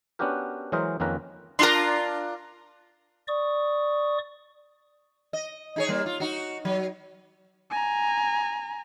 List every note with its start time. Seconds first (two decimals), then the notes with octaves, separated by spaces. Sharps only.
0.19 B3 C#4 D4 F#4 G4 A#4
0.72 E3 F#3 G#3 A#4 C5 D#5
1.00 F2 D#3 A#3 C#4 B4 A#5
1.59 D4 F4 A#4 A#5 C6
3.28 D5 C#6 D#6
5.33 D#5
5.76 D#4 G#4 C#5
5.89 G3 A#3
6.06 F4
6.20 D#4 F#4
6.65 F#3
7.70 G#5 A#5